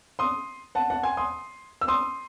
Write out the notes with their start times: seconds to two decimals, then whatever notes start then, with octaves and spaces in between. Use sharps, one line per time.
0.19 C6 D#6
0.75 F#5 A5
0.90 F#5 A5
1.03 G#5 C6
1.17 C6 D#6
1.81 E6
1.88 C6 D#6